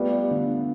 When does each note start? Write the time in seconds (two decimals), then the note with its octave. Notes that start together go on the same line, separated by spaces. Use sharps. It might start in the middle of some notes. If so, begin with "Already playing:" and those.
Already playing: G3 A3 B3 F4
0.31 D3